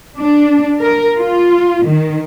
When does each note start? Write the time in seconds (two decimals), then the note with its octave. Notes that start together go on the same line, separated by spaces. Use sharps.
0.19 D4
0.81 A#4
1.19 F4
1.86 D#3